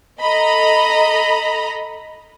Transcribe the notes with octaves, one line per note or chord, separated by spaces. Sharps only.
A4 D#5 A#5 B5